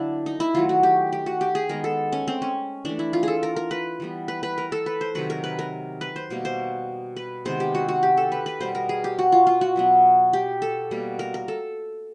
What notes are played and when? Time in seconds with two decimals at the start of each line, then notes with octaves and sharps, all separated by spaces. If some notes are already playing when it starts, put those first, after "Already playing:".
Already playing: D3 F#3 A#3 D4 E4
0.26 D#4
0.40 E4
0.54 D#3 F#3 A3 F4
0.69 F#4
0.83 G4
1.12 G4
1.26 F#4
1.41 G4
1.55 G#4
1.69 D#3 G#3 B3 A#4
1.84 A4
2.12 C#4
2.28 C4
2.42 C#4
2.85 E3 A3 D4
2.99 E4
3.13 F4
3.23 G#4 A4
3.43 A#4
3.56 A#4
3.71 B4
4.00 E3 G3 B3
4.28 B4
4.43 B4
4.58 A#4
4.72 A4
4.86 B4
5.01 C5
5.15 C3 D#3 F#3 B4
5.30 A#4
5.44 B4
5.59 A#4
6.01 B4
6.16 C5
6.30 B2 G3 A#3
6.45 C5
7.16 B4
7.45 C3 D#3 G#3 B3 C5
7.60 G4
7.75 F#4
7.89 F#4
8.03 G4
8.17 A4
8.32 B4
8.46 B4
8.61 B2 G3 B3 C5
8.75 A#4
8.89 G#4
9.04 G4
9.19 F#4
9.32 F4
9.47 F4
9.61 F#4
9.76 B2 F#3 B3
10.33 G4
10.62 A4
10.91 B2 G3 A#3
11.19 A#4
11.34 A#4
11.48 A4